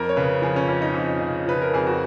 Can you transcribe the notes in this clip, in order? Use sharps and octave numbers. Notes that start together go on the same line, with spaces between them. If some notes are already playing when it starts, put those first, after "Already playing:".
Already playing: F2 A#4
C#5
C#3 B4
F3 G#4
C#4
F2 C#4
D#4
F2
C#3
F3 B4
A#4
F2 G#4
F#4